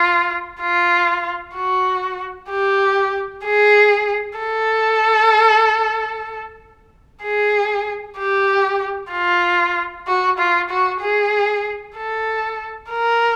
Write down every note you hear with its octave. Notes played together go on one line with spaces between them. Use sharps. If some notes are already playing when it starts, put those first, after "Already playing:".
Already playing: F4
F4
F#4
G4
G#4
A4
G#4
G4
F4
F#4
F4
F#4
G#4
A4
A#4